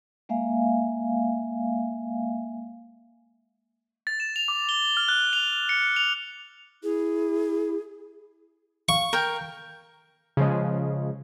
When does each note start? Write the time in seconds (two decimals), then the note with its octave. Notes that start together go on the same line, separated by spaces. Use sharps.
0.29 G#3 A#3 E5 F5 G#5
4.07 A6
4.20 E7
4.36 F7
4.48 D6
4.69 G7
4.97 F6
5.08 F#6
5.33 F7
5.69 C#7
5.96 F7
6.83 E4 G#4
8.89 F5 C#6
9.13 A#4 G5
10.37 C#3 F3 G#3